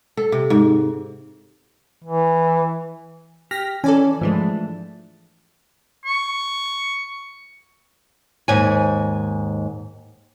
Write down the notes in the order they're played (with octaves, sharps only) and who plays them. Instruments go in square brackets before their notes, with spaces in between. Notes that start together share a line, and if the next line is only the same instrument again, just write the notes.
[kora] A4
C3
G#2
[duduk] E3
[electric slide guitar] G4 [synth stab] F6 A#6 B6
[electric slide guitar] E3 [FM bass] C#4 [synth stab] A4 D5 G#5
[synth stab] G#2 E3 G#3 [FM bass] F3 [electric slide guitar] A3 D4
[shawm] C#6
[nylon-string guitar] D#2 G#2 G#5